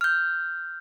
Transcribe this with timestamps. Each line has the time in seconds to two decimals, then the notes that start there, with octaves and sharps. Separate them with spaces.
0.01 F6 G6